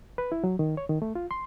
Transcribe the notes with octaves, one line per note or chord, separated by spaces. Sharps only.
B4
E4
F#3
D#3
C#5
D#3
A3
F4
C6